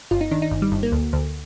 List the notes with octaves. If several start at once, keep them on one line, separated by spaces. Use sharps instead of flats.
G1 F4
D#4
D#3 D4
D#4
G1
G3
G1
A#3
D2
D2